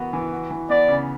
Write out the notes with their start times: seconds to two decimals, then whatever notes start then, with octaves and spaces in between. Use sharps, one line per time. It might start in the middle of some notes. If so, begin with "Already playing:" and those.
Already playing: E3 B3 F#4 A#4
0.13 E3
0.32 F#4
0.51 E3
0.69 B3 D5
0.88 C#3